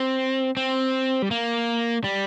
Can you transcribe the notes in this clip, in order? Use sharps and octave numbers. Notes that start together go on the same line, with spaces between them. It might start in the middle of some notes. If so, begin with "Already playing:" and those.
Already playing: C4
C4
G3
A#3
G3